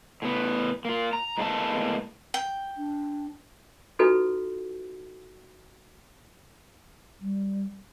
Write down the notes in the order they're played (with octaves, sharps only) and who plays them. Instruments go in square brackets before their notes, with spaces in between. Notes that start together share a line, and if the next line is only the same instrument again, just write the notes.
[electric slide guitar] A2 B3
A#3 F4
A#5
A2 G#3 A#3 B3 A5
[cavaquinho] G5
[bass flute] D4
[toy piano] D#4 F4 F#4 A4 B4
[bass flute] G3